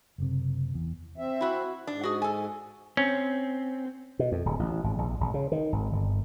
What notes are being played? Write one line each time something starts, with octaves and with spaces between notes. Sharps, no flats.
F#1 C3
E2
C4 E5
E4 F#4
G#2 D4
F#4 G#4
A4 G#5
C4 C#4
B2
F2
D1
A1
G#1
A#1
G#1
C#3
D#3
G#1
G1